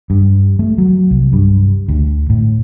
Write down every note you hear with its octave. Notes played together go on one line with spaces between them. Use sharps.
G2
A3
F#3
C2
G2
D2
A2